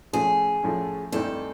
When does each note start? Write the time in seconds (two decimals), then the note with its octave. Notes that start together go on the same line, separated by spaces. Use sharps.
0.13 A2 F3 A3 C#4 G#4
0.63 A2 F3 A3 C#4
1.12 G2 E3 A3 C4 D#4 A4